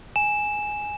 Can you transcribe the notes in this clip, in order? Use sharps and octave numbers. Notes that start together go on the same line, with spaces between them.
G#5 E7